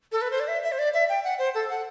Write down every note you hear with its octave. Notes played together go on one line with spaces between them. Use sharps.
A4
B4
C5
D5
E5
E5
C5
D5
E5
G5
F#5
C5
A4
F#5